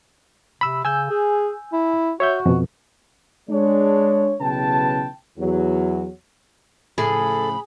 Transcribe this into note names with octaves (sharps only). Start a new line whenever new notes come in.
C3 B5 E6
C#3 G#5 E6 G6
G#4
E4
F#4 C#5 E5 G6
F2 B2
G#3 D4 C#5
B1 C#3 E3 B4 G5 A5
E2 F#3
A2 C#3 F3 G#4 A4 B5